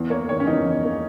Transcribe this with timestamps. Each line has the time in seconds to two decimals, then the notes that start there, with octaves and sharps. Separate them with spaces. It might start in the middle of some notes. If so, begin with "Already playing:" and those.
Already playing: E2
0.10 A#3 C#5
0.29 D#3 C#5
0.40 C#4
0.47 E2 D#4
0.66 E2
0.85 A#3